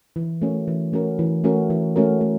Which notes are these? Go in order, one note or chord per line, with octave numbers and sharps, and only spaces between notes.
E3
A3 C#4 F#4 A#4
E3
A3 C#4 F#4 A#4
E3
A3 C#4 F#4 A#4
E3
A3 C#4 F#4 A#4
A3